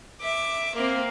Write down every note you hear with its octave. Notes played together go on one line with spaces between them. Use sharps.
E5 D6
A#3 C4